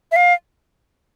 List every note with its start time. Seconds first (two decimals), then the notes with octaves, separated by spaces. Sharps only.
0.12 E5
0.16 F5